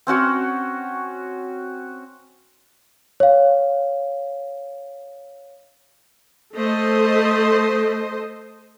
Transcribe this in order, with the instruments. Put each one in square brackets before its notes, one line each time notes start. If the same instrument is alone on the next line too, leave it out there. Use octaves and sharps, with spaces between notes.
[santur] C4 C#4 F#4 C#5
[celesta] C#5 F5
[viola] A3 [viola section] A4 C5 D#5